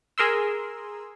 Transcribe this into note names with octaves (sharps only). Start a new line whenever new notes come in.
G#4 A#4 C6 E6